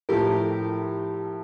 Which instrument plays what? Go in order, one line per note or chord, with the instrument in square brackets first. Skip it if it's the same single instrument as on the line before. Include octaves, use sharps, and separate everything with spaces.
[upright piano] A2 F3 A3 [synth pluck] G4 A#4